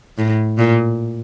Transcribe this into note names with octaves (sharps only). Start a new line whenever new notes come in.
A2
A#2